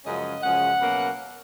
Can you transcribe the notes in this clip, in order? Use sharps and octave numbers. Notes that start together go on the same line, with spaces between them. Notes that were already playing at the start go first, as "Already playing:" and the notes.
F#2 C#3 F3 G#3 C#4 D#5
F#2 C#3 F3 G#3 C#4 F#5
B2 F#3 A#3 C#4